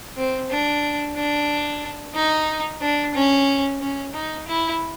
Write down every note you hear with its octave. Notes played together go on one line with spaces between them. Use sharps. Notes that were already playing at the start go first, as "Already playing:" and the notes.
C4
D4
D4
D#4
D4
C#4
C#4
D#4
E4